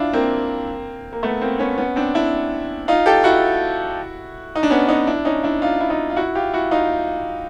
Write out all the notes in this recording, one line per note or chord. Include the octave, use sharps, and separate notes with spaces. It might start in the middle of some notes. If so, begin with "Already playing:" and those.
Already playing: D4 E4 F4
A#3 C4
A#3
A3 B3
A#3 C4
B3 C#4
B3 C#4
C4 D4
D4 E4
D#4 F4
G4 A4
E4 F#4
D#4
D4
B3 C#4
C#4 D#4
D4 E4
C#4 D#4
D4 E4
D#4 F4
E4
D#4 F4
F4
E4 F#4
F4 G4
E4 F#4
D#4 F4